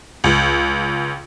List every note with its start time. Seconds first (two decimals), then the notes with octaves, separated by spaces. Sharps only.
0.24 C#2